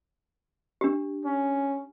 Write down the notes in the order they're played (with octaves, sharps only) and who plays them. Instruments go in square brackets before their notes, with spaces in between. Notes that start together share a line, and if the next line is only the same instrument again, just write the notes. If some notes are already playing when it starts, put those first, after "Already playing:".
[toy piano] D4 G4
[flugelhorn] C#4